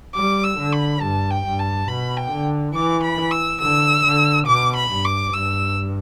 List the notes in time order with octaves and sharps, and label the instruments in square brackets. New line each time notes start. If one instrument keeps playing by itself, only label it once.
[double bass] G3 [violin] D6
[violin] E6
[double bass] D3
[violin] B5
[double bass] G2 [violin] A5
[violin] G5
[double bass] G2
[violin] A5
[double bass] B2 [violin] B5
[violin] G5
[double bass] D3
[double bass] E3 [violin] D6
[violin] B5
E6
[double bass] D3 [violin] E6
[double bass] D3
[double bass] B2 [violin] D6
[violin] B5
[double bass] G2
[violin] D6
[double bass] G2 [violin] E6